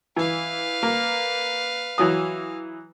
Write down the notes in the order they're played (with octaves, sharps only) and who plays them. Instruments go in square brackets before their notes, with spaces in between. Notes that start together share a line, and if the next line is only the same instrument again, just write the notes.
[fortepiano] E3 [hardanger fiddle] B4 F5
[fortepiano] A#3
E3 F#3 D#6